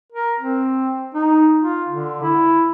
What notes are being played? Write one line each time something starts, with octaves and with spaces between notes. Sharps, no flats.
A#4
C4
D#4
F4
D3
E4